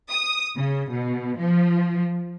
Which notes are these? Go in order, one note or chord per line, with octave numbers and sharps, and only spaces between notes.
D#6
C#3
B2
F3